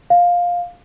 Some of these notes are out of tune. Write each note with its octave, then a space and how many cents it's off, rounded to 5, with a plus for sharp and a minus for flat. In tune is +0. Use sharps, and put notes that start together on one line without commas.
F5 +10